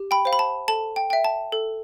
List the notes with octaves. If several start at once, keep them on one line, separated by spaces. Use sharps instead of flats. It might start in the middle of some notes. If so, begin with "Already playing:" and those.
Already playing: G4
G5 B5
C5 F5
B5
A5
A4 A5
G5
E5 G5
A5
A4